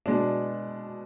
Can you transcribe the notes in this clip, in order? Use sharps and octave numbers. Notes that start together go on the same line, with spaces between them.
B2 G#3 D4